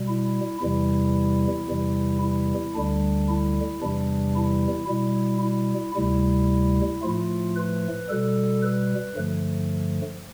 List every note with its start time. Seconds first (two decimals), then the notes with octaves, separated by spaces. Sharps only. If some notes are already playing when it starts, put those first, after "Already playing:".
Already playing: B2 G3
0.08 E4
0.62 E2 C3 E3 G3 E4
1.69 E2 C3 E3 G3
2.22 E4
2.75 D2 D3 G3 D4
3.28 E4
3.82 E2 C3 E3 G3 D4
4.35 E4
4.89 B2 G3 E4
5.42 E4
5.96 D2 C3 G3 E4
7.02 A2 F3 A3 F4
7.56 B4
8.09 B2 G3 A4
8.62 B4
9.16 G2 D3 F3 A3